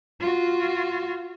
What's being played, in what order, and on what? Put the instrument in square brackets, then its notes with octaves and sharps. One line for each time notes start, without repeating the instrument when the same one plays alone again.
[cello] F4 F#4